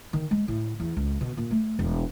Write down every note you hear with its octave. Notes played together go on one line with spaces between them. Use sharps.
D#3
G#3
A2
E2
C#2
B2
A#2
A3
E1